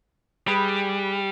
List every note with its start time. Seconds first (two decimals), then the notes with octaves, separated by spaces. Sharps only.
0.47 G3 G#4 B4